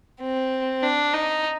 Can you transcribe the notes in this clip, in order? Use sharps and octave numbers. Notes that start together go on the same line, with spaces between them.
C4
D4
D#4